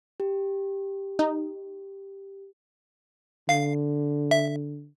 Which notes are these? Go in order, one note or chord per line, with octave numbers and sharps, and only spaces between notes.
G4
D#4
D3 F5 C7
E5